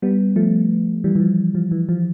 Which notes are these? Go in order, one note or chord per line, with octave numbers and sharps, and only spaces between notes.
G3 B3
F3 A3
E3 G3
E3
F3
F3
E3
F3